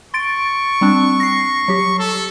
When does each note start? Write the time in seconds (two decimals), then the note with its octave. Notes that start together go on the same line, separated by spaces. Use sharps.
0.14 C6 C#6 A6 D7
0.81 G3 C4 D4
1.20 A#6 C7
1.68 F#3 G4
1.99 A4